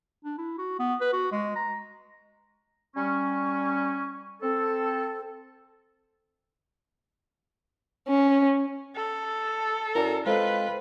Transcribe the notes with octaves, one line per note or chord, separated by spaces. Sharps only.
D4
E4
F#4
B3
B4
F#4
G#3
A#5
G3 C#4 C#6
C4 A4
C#4
A4
F#2 E4 A#4 D5
G#3 C4 F4 A4 B4 D#5